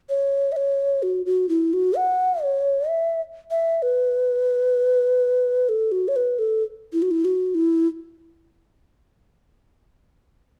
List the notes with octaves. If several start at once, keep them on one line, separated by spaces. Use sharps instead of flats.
C#5
E5
C#5
F#4
F#4
E4
F#4
F#5
C#5
E5
E5
B4
A4
F#4
C#5
B4
A4
E4
F#4
E4
F#4
E4